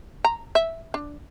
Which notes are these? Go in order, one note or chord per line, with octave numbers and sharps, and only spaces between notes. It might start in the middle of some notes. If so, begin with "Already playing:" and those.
A#5
E5
D4